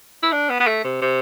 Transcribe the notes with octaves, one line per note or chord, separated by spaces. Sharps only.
E4
D4
B3
B3
A3
C3
C3